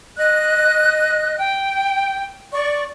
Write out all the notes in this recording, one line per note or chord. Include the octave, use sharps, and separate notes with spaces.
D#5 F#6
G5
D5 C#6